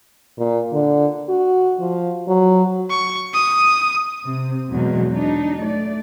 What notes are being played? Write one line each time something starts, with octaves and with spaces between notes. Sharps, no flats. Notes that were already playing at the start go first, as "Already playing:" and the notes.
A#2
D3
F#4
F3
F#3
C#6
D#6
C3 C4
E2 B2 F#3 G#3
D4 D#4
A3 D5